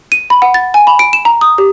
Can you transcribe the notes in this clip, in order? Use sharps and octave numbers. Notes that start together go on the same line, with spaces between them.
D#7
B5
F#5
A6
G#5
B5
D7
E7
A#5
D#6
G4